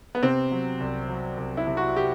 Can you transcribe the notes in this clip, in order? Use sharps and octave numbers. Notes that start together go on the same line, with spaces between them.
B3
C3 C4
F#3
C2
F#3
C2
E4
C3
F#4
G4